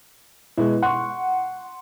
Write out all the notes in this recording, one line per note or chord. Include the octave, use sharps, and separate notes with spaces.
B2 G#3 E4
F#5 C6 C#6